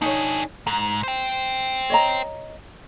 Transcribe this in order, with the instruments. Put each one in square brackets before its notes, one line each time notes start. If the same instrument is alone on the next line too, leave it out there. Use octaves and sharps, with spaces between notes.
[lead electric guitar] D4 G#4 [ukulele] D#4 C#5
[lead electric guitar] G#2 [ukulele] A#5
[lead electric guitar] C5 G5
[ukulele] C#5 D#5 A#5